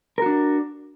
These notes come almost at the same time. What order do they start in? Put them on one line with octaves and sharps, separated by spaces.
A#4 F#4 D4